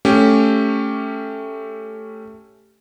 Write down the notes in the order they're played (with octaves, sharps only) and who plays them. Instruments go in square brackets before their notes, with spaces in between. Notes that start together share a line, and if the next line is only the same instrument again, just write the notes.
[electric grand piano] A3 C#4 G4